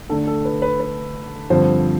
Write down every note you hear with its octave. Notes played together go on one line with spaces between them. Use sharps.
D3 A3 D4 A4
A4
B4
B4
B4
G2 D3 F3 C4 C5